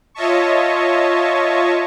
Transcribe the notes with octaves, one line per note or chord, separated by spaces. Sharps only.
F4 C#5 D#5 E5 A5 C#6